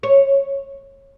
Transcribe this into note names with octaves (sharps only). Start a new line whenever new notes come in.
C#5